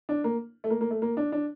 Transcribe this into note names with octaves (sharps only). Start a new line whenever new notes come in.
D4
A#3
A3
A#3
A#3
A3
A#3
D4
D4